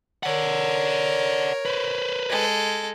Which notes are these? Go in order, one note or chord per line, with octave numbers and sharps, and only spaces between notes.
A#4 C#5 D5 F#5
B4 C5
G#3 A4